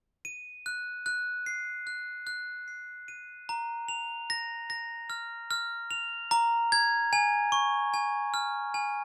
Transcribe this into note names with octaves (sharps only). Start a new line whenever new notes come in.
D#7
F#6
F#6
C7
F#6
F#6
C7
D#7
A#5
F7
A#6
A#6
F6
F6
F7
A#5
G#6
G#5
C#6
G#5
F6
G#5